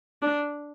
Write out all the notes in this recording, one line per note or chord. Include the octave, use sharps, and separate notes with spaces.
D4